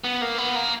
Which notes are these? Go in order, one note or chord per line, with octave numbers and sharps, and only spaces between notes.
B3
A#3
B3
A#3